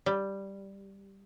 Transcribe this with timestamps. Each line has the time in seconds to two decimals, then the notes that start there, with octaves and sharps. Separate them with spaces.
0.06 G3